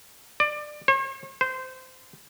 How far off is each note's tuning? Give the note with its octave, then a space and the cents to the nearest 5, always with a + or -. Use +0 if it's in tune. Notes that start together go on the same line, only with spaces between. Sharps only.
D5 +25
C#5 -45
C5 -20